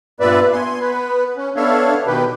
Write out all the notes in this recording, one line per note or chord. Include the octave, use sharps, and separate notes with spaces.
G2 A#2 B3 B4 D5 E5
B3 G#5 C6
B3 B4
C#4
B3 D4 A4 C#5 E5 F5
B2 D#3 G4 B4